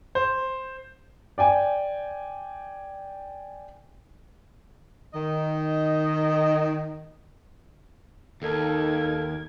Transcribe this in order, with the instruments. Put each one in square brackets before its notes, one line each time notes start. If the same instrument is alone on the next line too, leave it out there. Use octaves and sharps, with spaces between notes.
[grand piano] C5
[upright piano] D5 G5 G#5
[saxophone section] D#3 D#5
[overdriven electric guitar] D#2 [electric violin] D#4 G#6 [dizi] A4 [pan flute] A#4